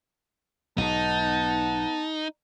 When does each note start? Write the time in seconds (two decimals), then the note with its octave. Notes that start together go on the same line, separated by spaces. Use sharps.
0.78 B1 G#2 B3 D#4 F#5 A5